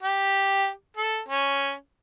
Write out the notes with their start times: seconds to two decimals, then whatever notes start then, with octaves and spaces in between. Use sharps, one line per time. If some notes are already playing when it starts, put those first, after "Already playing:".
0.03 G4
0.97 A4
1.29 C#4